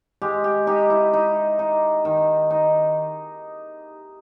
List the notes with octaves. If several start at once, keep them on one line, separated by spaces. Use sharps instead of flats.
G#3 G4
G4
D#4 G4
E4
D#4
D#4
D#3
D#4